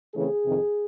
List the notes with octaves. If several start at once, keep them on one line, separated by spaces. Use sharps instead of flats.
C#3 E3 A3 C4 G#4
F2 C3 D#3